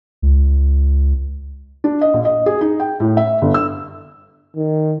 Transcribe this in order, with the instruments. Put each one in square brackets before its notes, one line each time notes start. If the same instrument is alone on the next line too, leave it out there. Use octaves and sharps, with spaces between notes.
[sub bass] C#2
[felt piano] D4
D#5
A#1
D#5
G#4
D#4
G5
A2
E5
G1
E6
[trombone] D#3